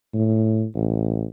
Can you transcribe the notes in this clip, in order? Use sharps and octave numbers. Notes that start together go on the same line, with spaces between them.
A2
A1